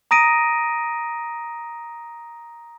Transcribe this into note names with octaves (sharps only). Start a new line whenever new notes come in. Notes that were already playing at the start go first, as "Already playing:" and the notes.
A#5 D#6 A#6 D7 D#7